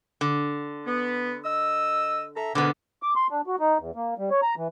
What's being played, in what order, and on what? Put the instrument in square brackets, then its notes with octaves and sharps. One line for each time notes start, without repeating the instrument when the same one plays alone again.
[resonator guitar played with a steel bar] D3
[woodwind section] B3
D#5 E6
A4 E5 A#5
[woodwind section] G#2 B2 A#3 [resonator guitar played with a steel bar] D3 B3
[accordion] D6
C6
D4
F#4
D#4
E2
A#3
G3
C#5
A#5
E3